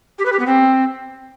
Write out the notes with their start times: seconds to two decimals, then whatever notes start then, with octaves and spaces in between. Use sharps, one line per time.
0.19 G4
0.25 B4
0.32 G4
0.39 B3
0.46 C4